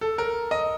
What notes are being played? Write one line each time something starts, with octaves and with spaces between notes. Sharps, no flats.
A4
A#4
D#5